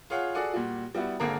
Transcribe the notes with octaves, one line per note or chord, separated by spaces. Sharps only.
F4 G#4 C#5 F5 F#5
F#4 G#4 A4 D5 F#5 G#5
A#2 G3 F#4
G3 B3 E4 F#4
G#1 D3 A#3 G#4 A#4